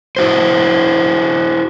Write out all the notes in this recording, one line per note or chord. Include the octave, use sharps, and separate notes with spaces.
E4 F#4 C5